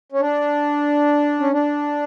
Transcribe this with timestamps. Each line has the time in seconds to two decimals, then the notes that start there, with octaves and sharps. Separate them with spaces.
0.12 C#4
0.20 D4
1.40 C#4
1.52 D4